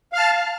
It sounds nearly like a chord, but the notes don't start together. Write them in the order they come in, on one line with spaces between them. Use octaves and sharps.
F5 F6 A5